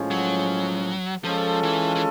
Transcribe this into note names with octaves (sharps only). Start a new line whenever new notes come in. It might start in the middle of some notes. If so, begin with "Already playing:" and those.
Already playing: A2 F3 G#3 C#4
F#3
F3 G#3 C#4 F4 A4
E3
E3